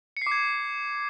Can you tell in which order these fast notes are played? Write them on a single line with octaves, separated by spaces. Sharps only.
C#7 C7 D6 G#6